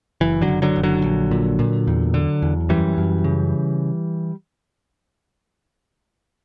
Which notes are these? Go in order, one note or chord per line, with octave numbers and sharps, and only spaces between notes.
F#1 E3
D3 F#3
F#1
D3 F#3
F#1
D3 F#3
A#1
A#2
A#2
E2
D3
E2
F#2 E3 G3
F#2
C#3